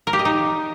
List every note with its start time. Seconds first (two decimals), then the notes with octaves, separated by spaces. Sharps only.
0.07 A#4
0.13 G4
0.19 D#5
0.25 D#4